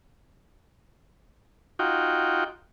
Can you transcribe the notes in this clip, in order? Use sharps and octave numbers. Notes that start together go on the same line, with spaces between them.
D#4 F4 F#4 G5